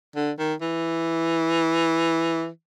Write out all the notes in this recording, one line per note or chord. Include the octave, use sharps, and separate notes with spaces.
D3
D#3
E3